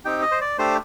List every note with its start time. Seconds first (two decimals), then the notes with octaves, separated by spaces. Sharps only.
0.05 C4 D#4 G4 G5
0.22 D#5
0.31 C5
0.41 D5
0.58 A3 D4 G4 C5